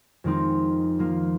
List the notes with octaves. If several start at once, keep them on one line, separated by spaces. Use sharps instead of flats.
F2 D#3 G#3 C4 D#4
F3 A#3 F4